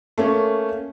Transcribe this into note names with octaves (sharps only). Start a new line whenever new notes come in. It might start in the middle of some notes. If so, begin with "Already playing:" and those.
A3 A#3 C#4